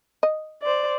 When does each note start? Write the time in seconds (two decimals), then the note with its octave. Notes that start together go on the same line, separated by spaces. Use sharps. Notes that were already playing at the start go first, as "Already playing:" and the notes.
0.23 D#5
0.63 C5 D5